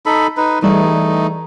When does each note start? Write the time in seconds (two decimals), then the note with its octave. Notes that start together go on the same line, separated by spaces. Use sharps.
0.06 D#4 A4 B5
0.37 D#4 B4
0.62 E3 G3 A3 D#4 G#4